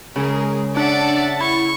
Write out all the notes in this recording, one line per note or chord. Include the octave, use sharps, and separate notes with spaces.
C#3 G#3 G#4 A#4
D4 D5 E5 F#5 A6
E4 C#6